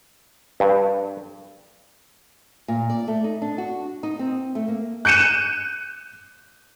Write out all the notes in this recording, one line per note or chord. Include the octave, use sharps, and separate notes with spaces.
G2
A#2
D5
A3
D#4
D4
F#4
D#4
C4
A3
A#3
F#6 G6 C#7 D#7 E7